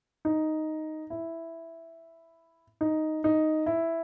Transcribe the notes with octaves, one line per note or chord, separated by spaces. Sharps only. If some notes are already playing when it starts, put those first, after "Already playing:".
D#4
E4
D#4
D#4
E4